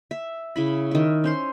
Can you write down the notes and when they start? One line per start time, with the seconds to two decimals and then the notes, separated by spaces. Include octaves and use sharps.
0.11 E5
0.56 C#3 E4 B5
0.91 D#3 E5
1.24 C#4 C5 C6